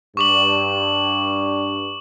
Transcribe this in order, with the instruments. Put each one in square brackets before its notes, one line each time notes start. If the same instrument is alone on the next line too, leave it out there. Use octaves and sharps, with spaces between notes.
[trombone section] G2 [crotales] C#6 D6 F#7